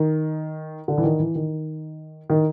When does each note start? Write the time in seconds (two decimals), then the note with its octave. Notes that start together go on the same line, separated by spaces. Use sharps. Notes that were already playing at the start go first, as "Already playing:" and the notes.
Already playing: D#3
0.88 D3
0.98 E3
1.04 D#3
1.19 E3
1.35 D#3
2.30 D#3